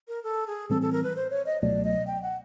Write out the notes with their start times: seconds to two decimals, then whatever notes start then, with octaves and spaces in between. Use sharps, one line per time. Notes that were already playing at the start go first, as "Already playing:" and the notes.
0.08 A#4
0.24 A4
0.47 G#4
0.70 A2 E3 G3 C4 A4
0.82 A4
0.92 A#4
1.04 B4
1.16 C5
1.30 C#5
1.46 D#5
1.61 C#2 B2 F#3 A3 D5
1.84 D#5
2.07 G5
2.22 F#5